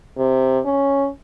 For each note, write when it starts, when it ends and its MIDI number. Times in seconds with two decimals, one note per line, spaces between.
0.18 0.59 48
0.65 1.08 61